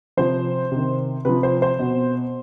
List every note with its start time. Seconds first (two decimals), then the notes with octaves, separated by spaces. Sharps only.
0.17 C3 F3 C5
0.72 C3 D#3
1.25 C3 F3 B4
1.43 C5
1.62 C5
1.79 B2